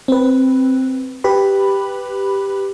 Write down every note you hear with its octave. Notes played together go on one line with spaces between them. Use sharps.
C4 B4
G4 B4 B5